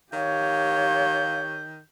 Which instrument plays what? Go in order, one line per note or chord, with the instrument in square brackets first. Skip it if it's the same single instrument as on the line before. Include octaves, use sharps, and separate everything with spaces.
[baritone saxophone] D#3 [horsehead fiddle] G4 C#5 [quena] F5 [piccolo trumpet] G6